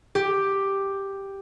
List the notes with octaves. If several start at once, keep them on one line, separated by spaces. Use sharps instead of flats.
G4